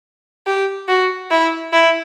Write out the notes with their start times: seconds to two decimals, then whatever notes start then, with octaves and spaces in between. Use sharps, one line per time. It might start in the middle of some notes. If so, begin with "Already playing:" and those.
0.47 G4
0.88 F#4
1.31 E4
1.73 E4